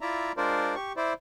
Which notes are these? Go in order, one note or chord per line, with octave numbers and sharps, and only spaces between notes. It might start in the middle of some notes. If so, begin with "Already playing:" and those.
E4 F4 D5 E5 A#5
G#3 D4 F4 A#4 C5 D5
G4 C#6
E4 C5 D5